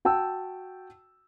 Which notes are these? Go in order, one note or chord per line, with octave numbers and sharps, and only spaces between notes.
F#4 G5 A5 E6